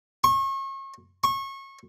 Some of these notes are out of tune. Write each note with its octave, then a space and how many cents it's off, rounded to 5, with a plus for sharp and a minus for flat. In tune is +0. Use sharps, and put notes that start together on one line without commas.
C#6 -35
C#6 -25